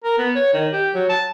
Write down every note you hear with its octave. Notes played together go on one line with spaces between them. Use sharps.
A#4
B3
C#5
D#3
G4
F#3
A5